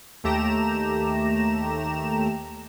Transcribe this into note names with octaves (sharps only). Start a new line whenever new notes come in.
D#2 A3 G4 A#5 E7